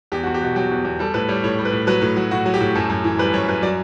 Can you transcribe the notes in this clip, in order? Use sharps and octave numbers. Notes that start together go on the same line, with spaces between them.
E2 G4
F#4
E2
G4
B2 F#4
F#3 G4
E2
E2
G3 A4
A2 B4
G3 C#5
A2 C#5
G3
B4
A2
F#3 B4
A2
F#3
A2 F#4
F#3
G4
A2
F#2 A4
F#2
E3
G3 B4
F#2 C#5
F#2 B4
F#3 D5